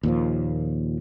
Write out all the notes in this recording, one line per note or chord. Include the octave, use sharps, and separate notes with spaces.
D#2 A#2 F3